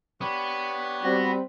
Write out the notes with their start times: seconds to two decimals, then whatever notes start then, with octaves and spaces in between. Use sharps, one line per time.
0.21 B3 D4 G4 C#5
1.03 G3 C4 F#4